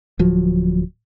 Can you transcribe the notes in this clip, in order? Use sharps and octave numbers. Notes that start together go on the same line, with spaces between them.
D1 F3 F#3